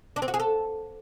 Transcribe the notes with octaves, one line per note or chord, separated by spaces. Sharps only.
D4
C4
F#4
G#4
A4